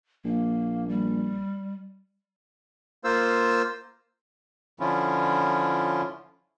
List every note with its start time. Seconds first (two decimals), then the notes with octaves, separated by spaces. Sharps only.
0.25 A#1 A#3
0.88 G3
3.04 A#3 F4 C5 E6
4.80 D3 F3 C#4 E4 F4